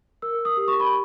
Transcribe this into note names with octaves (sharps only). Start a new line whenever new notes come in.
A#4 E6
D#6
G4
C#6
B5